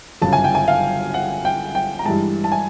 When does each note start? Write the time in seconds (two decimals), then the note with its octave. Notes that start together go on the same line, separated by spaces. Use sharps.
0.22 G1 F#2 C#3 A5
0.33 G#5
0.44 G5
0.55 G#5
0.68 F5
1.14 F#5
1.45 G5
1.75 G5
1.99 A#5
2.05 G2 E3 G#3 A5
2.44 A5
2.52 G#5